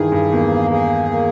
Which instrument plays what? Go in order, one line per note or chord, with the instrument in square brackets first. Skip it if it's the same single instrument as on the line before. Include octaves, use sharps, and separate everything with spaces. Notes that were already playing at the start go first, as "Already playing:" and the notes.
Already playing: [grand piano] G2 D#3 E3 [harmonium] G#4
[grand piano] G2
[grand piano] E2 [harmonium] A#3
[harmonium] G#4
A#3